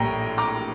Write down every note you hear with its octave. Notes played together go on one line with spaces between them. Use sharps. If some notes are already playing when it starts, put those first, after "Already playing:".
Already playing: A#1 A2 G3 A#3 G5 A#5
A#5 D6